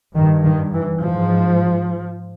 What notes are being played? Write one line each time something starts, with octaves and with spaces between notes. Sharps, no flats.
G2 D#3
D#3
E3
G#2 F3